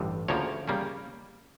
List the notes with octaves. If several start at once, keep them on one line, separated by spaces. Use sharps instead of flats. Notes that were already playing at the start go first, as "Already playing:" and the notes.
Already playing: A1 G2 D3
D2 C#3 F3 A#3 C#5
C#3 G3 A#3 C#4